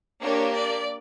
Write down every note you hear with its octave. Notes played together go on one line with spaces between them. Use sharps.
A#3 D4 G4 C#5
D5